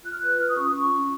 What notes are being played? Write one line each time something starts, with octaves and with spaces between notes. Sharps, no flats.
F4 F#6
F6
B4 F#6
F4 F6
D#6
C#4 C#6
D#6
F4 C#6
C#4